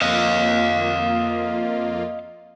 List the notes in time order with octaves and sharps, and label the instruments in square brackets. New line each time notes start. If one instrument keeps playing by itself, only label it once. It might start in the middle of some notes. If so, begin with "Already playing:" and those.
[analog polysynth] F2 A#3 F4 [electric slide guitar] D#5 F5